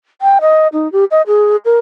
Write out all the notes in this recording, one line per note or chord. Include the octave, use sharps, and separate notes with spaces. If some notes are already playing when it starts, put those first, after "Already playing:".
G5
D#5
D#4
G4
D#5
G#4
A#4